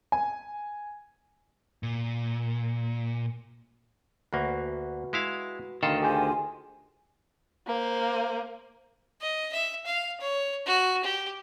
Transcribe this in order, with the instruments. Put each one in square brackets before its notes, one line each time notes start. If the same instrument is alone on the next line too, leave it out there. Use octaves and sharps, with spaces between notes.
[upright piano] G#5
[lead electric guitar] A#2
[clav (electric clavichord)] D2 A#3 [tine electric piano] F#4 B4
[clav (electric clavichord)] G#3 E4 F5
[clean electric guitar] D2 D#3 [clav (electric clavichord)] A4 [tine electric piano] F5 C6
[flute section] F4 G#5 [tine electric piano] G4 G#4 C5
[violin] A#3 C5
[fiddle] D#5
E5
F5
C#5
F#4
G4